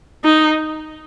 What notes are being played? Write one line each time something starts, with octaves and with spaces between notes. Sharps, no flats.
D#4